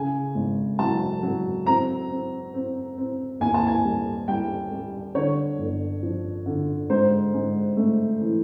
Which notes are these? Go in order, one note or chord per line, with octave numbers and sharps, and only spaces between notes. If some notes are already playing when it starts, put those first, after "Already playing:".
Already playing: C#3 G#5
G#1
F#3 A5
F#3
C4 A#5
C4
C4
C4
D#2 G#5
A5
G#5
G3
G3 G5
G3
D3 C#5
G1
F3
D3
G#2 C5
G#2
A3
E3